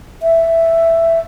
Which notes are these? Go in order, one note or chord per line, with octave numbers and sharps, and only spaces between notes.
E5